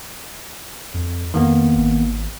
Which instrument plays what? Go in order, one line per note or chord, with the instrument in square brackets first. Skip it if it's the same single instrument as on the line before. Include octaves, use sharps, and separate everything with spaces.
[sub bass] F2
[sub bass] F2 [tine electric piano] D#3 A#3 B3
[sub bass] G#1